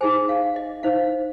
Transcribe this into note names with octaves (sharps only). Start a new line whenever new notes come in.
D#4 G#4 C5 G#5
F5
D#5
D#4 C5 F5